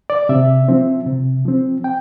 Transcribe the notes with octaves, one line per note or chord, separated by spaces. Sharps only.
D5
C3 E5
F3 C4
C3
F3 C4
G5